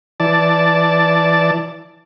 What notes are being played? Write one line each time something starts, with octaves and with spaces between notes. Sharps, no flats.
E3 D5 A5